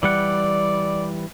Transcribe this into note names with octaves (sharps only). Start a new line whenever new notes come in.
E3 G3 D5 F#5